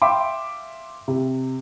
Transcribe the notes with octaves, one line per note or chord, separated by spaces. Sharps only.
E5 F5 G5 C6 D6
C3